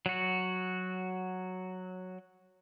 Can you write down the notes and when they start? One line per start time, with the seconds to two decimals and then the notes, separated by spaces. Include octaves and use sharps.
0.06 F#3 F#4